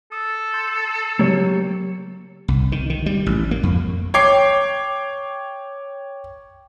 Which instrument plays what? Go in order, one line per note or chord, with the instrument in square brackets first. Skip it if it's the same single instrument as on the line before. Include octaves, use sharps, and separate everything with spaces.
[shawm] A4 [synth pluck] D#6
[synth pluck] C6 G6
[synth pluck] C#3 F#3 [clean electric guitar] A#3 G4 C#5
[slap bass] C2
D#3
D#3
G3
A1
A#3
F2
[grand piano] C#5 G5 D6 C7